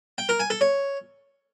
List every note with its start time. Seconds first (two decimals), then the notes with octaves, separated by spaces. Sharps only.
0.18 G5
0.29 A#4
0.40 G#5
0.50 A4
0.61 C#5